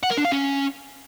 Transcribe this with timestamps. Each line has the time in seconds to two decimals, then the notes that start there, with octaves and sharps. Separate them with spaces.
0.03 F#5
0.11 A#4
0.18 D4
0.25 F5
0.32 C#4